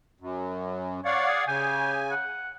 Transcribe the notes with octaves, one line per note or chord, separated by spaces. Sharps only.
F#2
C#5 D5 F5 F#5
G#4
C#3 G4 G#5
F#5